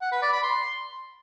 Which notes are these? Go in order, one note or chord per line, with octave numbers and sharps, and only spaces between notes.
F#5
B4
D5
B5
C6